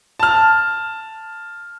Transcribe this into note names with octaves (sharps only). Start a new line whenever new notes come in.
A5 F6